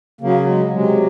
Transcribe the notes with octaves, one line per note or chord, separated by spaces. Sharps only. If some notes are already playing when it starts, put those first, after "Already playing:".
C#3 F#3 A#3
G#3
C3 F#3 G#3